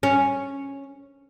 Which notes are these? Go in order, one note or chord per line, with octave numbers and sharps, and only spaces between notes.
C#4